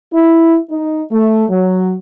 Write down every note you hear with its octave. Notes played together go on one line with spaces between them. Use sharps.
E4
D#4
A3
F#3